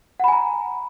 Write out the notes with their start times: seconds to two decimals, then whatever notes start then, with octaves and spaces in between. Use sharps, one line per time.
0.20 F#5
0.24 B5
0.28 G#5
0.32 A#5